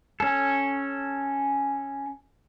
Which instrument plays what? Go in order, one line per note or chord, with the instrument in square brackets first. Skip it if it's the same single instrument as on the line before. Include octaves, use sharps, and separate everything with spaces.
[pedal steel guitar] C#4 A4